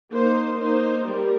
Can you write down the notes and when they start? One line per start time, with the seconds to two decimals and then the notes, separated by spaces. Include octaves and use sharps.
0.11 A#3 D#4 C5
0.58 A#3 D#4 C5
1.05 G3 A#3 G4 A#4